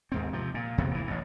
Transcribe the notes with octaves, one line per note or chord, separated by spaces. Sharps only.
D#2 G#2 C4
C3 F3
A#2
F#1 E2 C3 B3
A#2 E3
A1 F#2